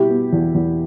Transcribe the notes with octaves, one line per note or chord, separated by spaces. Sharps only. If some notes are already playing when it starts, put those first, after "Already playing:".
Already playing: B2 G3 E4 G4
B3
E2
E2